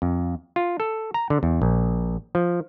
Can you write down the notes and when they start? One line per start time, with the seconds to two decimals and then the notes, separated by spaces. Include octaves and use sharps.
0.02 F2
0.56 F4
0.80 A4
1.14 A#5
1.30 D3
1.43 E2
1.62 A#1
2.35 F3